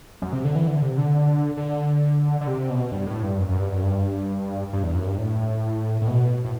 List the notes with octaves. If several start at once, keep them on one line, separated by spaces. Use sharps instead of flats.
F#2
C3
D3
E3
D3
C3
D3
D3
D3
C3
B2
G2
A2
G2
F#2
F#2
G2
F#2
G2
G2
E2
F#2
G2
A2
A2
B2
A2